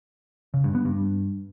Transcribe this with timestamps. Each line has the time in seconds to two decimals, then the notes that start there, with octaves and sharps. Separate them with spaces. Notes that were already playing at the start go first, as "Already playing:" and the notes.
0.54 C#3
0.64 G2
0.75 B3
0.85 G2